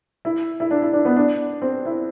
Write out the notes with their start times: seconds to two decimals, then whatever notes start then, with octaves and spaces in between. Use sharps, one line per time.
0.25 E4
0.60 E4
0.71 D4
0.82 E4
0.93 D4
1.05 B3
1.16 D4
1.62 C4
1.86 E4